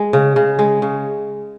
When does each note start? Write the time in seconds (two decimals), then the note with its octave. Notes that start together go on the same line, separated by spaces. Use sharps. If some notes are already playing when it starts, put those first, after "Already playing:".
Already playing: G#3
0.13 C#3
0.36 C#3
0.59 G#3
0.82 C#3